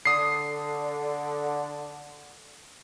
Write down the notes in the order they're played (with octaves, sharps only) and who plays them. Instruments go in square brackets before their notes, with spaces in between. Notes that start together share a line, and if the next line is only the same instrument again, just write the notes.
[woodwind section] D3 [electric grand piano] D#6 C7